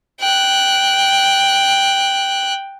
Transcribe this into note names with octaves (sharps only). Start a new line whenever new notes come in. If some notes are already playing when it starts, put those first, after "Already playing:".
G5 F#6